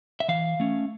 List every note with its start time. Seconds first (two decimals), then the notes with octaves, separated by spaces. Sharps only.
0.20 E5
0.28 E3 F5
0.60 A3 C#4